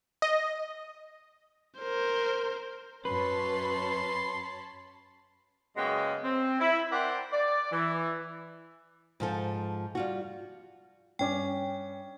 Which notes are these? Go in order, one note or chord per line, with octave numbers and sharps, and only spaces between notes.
D#5
A#4 C5
F#2 C#4 B4 C#5 A5 B5 C6
F#2 C#3 G#3 A#3 B3 G5
C4
E4
A#4 C5 D5 F#5 G5
D5
E3
G#2 F3 A4
G3 F4 F#4
G2 C#4 G5 D6